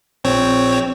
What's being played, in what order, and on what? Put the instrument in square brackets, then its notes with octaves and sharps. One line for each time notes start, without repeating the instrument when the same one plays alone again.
[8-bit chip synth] A#1 C4 C#5